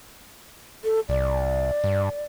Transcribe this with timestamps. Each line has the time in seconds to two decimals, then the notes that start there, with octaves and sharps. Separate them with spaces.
0.84 A4
1.09 C2 D5
1.84 G2